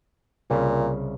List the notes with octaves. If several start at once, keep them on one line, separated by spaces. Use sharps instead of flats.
C2 A#2 C#3